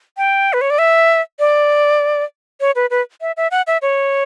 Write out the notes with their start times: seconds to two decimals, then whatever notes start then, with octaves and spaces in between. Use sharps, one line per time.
0.17 G5
0.53 B4
0.61 C#5
0.70 D5
0.79 E5
1.39 D5
2.60 C#5
2.76 B4
2.91 B4
3.21 E5
3.37 E5
3.51 F#5
3.67 E5
3.82 C#5